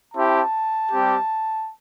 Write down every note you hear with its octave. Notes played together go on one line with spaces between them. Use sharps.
C4 E4 G4 A5
G3 C4 G4